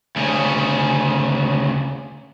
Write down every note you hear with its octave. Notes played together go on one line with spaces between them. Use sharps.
D2 C#3